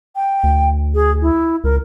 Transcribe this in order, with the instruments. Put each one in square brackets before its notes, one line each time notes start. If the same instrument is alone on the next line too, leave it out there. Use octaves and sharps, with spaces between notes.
[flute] G5
[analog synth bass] D2
[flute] G#4
E4
[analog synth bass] C#2 [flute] A#4